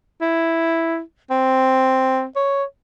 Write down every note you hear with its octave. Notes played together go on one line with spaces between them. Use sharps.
E4
C4
C#5